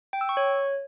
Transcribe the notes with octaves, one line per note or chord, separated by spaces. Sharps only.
G5
E6
C#6
C#5